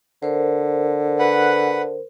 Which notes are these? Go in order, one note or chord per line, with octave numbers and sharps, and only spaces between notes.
D3 A#4 C5
B4 F#5